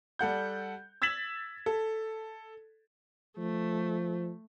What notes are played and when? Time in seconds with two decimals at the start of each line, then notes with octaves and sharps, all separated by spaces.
0.19 G3 A4 F#5 G6
1.02 E6 G#6 A6 B6 E7 F#7
1.66 A4
3.38 F3 A3